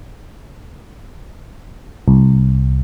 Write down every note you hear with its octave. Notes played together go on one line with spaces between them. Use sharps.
C2